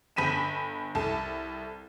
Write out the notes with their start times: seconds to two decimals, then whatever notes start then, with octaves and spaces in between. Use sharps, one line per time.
0.16 G1 B5 B6 D#7 E7
0.95 C2 A4 A5